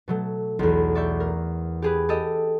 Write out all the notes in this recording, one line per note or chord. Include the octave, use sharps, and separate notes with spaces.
B2 F#3 A3
B1 E2
D5 E5 C#6 G6
A#4
G4 G#4 B4
G4 A4 D#5